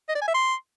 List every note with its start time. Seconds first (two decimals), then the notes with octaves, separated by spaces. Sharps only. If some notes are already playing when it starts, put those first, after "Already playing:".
0.09 D#5
0.15 D5
0.22 G#5
0.28 E5
0.34 C6